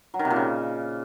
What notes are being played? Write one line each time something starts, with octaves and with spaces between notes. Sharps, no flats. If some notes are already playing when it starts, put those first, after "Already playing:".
F#3
D#3
C3
A#2
C#3